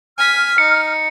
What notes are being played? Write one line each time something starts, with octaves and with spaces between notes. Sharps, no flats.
G#5 F6 B6
D#4 C#7